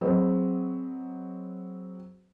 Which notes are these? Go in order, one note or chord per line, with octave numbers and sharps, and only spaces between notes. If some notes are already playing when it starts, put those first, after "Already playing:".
F#3 C4 G#4 B4 C5 D#5